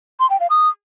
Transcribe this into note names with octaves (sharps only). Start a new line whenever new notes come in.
C6
G5
F5
D#6